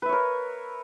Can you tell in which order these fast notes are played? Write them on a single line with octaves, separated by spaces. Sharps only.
B4 E5 C#5 A#4